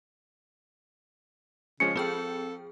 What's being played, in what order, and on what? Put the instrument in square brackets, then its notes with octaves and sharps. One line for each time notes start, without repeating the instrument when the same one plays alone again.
[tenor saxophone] C#3 [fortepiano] F3 G#3 C#4 [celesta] C#7
[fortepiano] F3 [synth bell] C4 G#4 G5 [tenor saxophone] A4